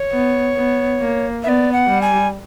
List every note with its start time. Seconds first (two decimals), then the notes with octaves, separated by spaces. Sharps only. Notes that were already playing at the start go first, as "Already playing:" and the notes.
Already playing: C#5
0.12 B3
0.56 B3
1.00 A#3
1.44 B3 E5
1.49 D5
1.73 F#5
1.88 G3
2.02 G#5